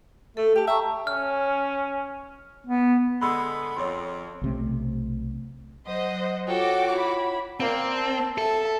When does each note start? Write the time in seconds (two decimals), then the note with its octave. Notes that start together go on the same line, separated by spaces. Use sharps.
0.37 A3 A4
0.56 G4 G5 A5
0.67 E5 A5 A#5 C#6
1.07 C#4 F6
2.67 B3
3.21 D3 G#3 B3 B5 C6 E6
3.77 F2 C#5 C6
4.42 B1 C3 A3
5.87 F#3 C5 D#5 F#5 D#6
6.47 F4 F#4 A4 C#5 F#5 G5 D6
6.93 E4 B5
7.60 A#3 C4 D5
7.94 A5
8.38 A4 E5 A5